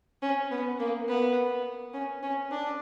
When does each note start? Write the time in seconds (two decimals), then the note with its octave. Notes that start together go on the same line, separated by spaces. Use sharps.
0.22 C#4
0.51 B3
0.79 A#3
1.08 B3
1.94 C#4
2.23 C#4
2.51 D4